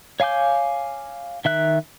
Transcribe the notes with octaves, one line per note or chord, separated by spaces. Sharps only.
C#5 F5 G#5 D6 G6
D#3 E5 F#6